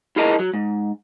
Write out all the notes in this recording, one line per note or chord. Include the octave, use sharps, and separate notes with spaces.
E4 F4 G#4 A#4 D#5 A5
F#3
G#2